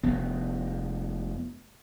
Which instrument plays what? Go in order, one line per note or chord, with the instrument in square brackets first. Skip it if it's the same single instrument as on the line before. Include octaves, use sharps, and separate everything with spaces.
[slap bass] F1 B3